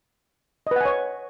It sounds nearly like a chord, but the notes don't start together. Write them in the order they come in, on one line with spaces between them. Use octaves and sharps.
D#5 B4 F#5 G#5 C#5